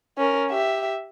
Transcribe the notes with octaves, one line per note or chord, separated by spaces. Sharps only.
C#4 A#4
G4 E5